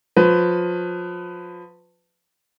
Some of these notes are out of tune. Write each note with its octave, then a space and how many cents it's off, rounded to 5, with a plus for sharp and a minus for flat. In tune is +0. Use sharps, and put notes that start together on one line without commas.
F3 +30 B4 +30